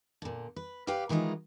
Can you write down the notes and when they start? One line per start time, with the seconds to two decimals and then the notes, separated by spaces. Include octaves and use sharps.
0.22 A#2 D3
0.56 B4
0.87 G4 B4 D5 F5 G5
1.09 D#3 E3 G#3 D#4 F4